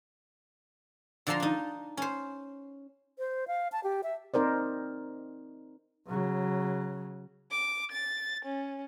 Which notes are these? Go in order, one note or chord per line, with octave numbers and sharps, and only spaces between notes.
D3 F3 D5 A5 A#5 C6
D4 D#4
C#4 C5
C5
F5
A5
G4
E5
C4 D#4 A#4 C5 D5
C#3 F#3
D6
A6
C#4